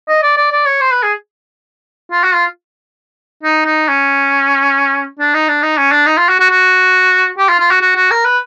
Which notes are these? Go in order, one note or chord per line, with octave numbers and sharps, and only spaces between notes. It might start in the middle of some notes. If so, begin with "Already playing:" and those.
D#5
D5
D5
D5
C#5
C5
B4
G#4
F4
F#4
F4
D#4
D#4
C#4
D4
D#4
D4
D#4
C#4
D4
D#4
F4
F#4
F#4
F#4
G4
F4
F4
F#4
F#4
F#4
A#4
B4